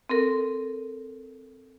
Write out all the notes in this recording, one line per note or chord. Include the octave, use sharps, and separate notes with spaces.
C4 A4 A#4